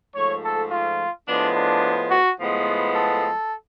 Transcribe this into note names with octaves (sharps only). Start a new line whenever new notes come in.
G#2 F3 A3 C#5
A4
F4
A2 F3 G#3 B3 D4
D4
F#4
A2 F3 G#3 B3
A4